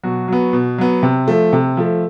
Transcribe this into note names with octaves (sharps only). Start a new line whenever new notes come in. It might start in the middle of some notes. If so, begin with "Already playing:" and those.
B2 F#3 F#4
F#3 B3
B2
F#3 B3
C3
F3 A3
C3
F3 A3